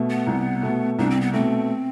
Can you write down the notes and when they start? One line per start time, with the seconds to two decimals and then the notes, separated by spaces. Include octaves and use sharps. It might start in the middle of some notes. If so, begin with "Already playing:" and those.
Already playing: B2 A3
0.10 B3
0.27 C2
0.63 B2 A3
0.99 C2 D4
1.10 C4
1.21 B3
1.33 B2 A3 C4